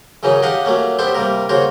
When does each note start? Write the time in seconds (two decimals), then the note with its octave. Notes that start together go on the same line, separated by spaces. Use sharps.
0.23 F#2 C#3 E3 C#4 D#4
0.42 D4 G4 D#5 F5 F#5
0.65 F#3 A3 A#3 C#4
0.99 B3 D4 G4 A4 C5
1.14 C3 G3 A#3 A#4
1.49 C#3 A#3 F#4 C5 C#5